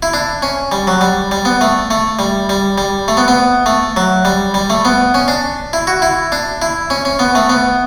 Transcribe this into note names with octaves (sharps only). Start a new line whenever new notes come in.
E4
D4
C#4
G3
F#3
G3
G3
B3
A3
A3
G3
G3
G3
A3
B3
B3
A3
F#3
G3
G3
A3
B3
C#4
D4
E4
F#4
E4
D4
E4
C#4
C#4
B3
A3
B3